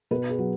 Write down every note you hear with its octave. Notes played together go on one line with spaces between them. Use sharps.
B2 B4
G#4
F#3